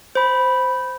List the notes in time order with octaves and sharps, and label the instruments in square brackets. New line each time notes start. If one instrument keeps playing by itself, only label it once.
[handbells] C5 B5